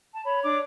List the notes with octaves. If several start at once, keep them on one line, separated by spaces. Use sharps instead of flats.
A5
C#5 B5
D4 D6